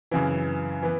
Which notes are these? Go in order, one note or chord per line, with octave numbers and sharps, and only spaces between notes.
F#2 C#3 E3
E3 B3